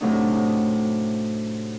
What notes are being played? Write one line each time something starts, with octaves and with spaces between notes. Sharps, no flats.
A2 C3 F#3 A3 D4 D#4